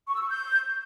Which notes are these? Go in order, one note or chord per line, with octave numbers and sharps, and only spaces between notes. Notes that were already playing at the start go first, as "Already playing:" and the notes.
C#6
E6
C#6
G6